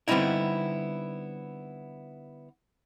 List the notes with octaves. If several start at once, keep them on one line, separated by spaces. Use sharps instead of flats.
D3 G3 B3 C4 D#4 E4